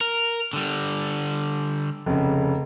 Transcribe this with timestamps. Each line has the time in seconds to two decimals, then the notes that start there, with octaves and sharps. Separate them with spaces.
0.01 A#4
0.53 D3 G3
2.06 F1 C#3